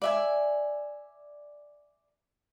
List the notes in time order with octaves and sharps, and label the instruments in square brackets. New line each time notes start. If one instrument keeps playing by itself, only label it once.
[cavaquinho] D5 E5 G#5